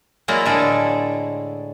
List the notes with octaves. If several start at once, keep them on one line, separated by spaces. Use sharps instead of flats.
F#3 G#3 A#3 E4 F#4 D5
A2 D3 G#3 A4 D5